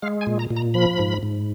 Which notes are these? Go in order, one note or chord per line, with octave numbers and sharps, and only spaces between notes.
G#3 F5
G#5
A#2
A#5
A#2
A#5
F3 B5
G#2
G#2